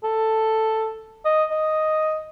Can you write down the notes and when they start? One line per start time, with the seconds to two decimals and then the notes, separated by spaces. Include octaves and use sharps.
0.04 A4
1.25 D#5
1.51 D#5